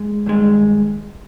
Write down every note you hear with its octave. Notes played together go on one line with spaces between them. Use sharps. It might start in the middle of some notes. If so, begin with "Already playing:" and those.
Already playing: G#3
G2 D#3 G#3